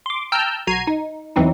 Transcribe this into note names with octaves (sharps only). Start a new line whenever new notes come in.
C6 D6
G5 A5 A#5 E6 F6 G6
B1 F#4 A#5 G#6 C7 D#7
D#4
E2 E3 F#3 C4 D#4 E4